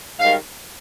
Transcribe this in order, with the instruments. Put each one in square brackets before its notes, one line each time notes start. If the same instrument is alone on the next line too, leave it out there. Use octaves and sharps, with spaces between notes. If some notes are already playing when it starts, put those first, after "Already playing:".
[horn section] G#2 D#3 G3 F5